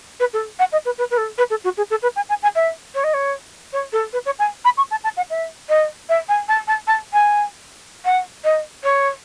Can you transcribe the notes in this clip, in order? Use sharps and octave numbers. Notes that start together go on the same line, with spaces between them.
B4
A4
F#5
D#5
B4
B4
B4
A4
B4
A4
F#4
G#4
A4
B4
G#5
G#5
G#5
E5
C#5
D#5
C#5
C#5
A4
B4
C#5
G#5
B5
C#6
A5
A5
F#5
E5
D#5
E5
G#5
A5
A5
A5
G#5
F#5
D#5
C#5